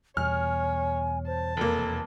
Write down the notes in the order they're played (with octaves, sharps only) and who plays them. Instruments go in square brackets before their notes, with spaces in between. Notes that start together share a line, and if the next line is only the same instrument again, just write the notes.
[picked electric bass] E2 B2 G3 [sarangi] C#5 [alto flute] G#5 [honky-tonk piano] F6
[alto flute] C5 [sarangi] A5
[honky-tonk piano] F1 A#3 [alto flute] A4